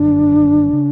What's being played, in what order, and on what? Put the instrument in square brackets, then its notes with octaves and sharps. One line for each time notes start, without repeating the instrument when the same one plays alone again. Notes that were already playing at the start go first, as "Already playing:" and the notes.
Already playing: [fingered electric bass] F#1 F#2 D3 [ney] D4
[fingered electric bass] C#3